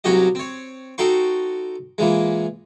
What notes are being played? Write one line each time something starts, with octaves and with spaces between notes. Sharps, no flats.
C2 F#3 C#4 F#4 G4 D#5
C4 C#5
D#4 F#4 A4 G5 C6 C#6
A#2 E3 G#3